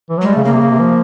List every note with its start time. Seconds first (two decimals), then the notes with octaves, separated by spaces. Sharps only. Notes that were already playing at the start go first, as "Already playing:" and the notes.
0.10 E3
0.18 F#3 G#3
0.27 G3
0.33 C#3 A3
0.45 C#3 A#3
0.53 C3
0.61 C#3
0.70 C3
0.80 F3